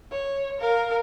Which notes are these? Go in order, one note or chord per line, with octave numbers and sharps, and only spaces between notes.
C#5
A#4 F5